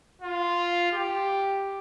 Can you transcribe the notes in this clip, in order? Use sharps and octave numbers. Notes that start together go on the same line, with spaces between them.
F4
G4